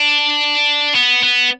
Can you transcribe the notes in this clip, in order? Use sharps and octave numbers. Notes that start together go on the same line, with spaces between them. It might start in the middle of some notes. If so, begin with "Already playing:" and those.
Already playing: D4
B3
B3